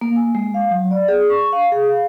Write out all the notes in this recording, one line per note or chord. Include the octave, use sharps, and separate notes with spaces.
A#3
G#5
G#3
F5
F#3
D5
G#4
C#6
F5
G#4
F5